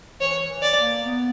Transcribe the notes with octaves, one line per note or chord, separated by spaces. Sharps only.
E3 C#5
E3
D5
A#3
B3